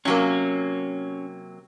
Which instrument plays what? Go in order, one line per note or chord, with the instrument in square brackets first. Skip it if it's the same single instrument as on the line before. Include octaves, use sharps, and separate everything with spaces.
[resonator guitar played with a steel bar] C3 F#3 A#3 [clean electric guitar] C#4